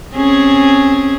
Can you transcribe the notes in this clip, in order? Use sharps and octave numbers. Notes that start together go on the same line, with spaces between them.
C4 C#4 G#4